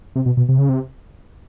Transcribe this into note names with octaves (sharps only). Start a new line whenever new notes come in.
C3
B2
B2
C3
C#3
C3